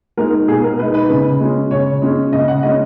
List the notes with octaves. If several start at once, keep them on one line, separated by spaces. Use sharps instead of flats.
G#3 D#4 A#4
B2 G#4
A#4
G#3 D#4 B4
B4
C#3
G#3 C#4
C#3 C#5
G#3 C#4
C#3 D#5
F#5
G#3 C#4 D#5